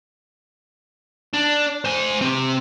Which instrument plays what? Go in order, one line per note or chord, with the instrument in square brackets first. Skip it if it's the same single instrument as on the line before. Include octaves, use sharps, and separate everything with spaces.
[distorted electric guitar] D4
C5 G#5
C4 G4